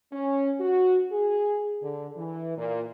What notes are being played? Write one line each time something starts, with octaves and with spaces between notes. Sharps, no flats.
C#4
F#4
G#4
D3
E3
A#2